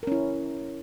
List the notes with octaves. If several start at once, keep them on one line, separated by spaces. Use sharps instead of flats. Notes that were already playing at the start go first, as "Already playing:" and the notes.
C#4 E4 A#4